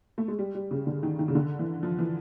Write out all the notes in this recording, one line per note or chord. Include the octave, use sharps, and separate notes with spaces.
A3
G#3
G3
G3
C#3
D3
D#3
D#3
C#3
D3
E3
F3
E3